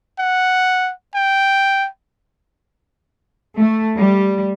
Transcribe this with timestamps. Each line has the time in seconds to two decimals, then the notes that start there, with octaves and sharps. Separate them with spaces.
0.19 F#5
1.15 G5
3.58 A3
3.98 G3